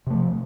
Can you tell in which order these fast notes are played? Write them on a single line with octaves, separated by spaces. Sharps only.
C3 A3 F3